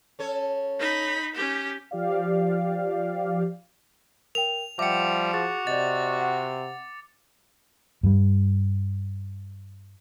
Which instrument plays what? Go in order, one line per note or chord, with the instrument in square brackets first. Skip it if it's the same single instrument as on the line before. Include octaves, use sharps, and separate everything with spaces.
[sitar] C#4 A4 C#5
[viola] D#4 B5
C#4 G4
[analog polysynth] F3 G4 D5 F5
[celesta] A#4 G5 [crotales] F7
[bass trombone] F3 [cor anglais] G3 [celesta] E5 F#5 G5 [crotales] D6 C#7
[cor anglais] F#4 [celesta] G#4 A6
[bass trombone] C3 [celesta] D5 D#5 [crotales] A6
[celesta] F#5
[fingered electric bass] G2 G3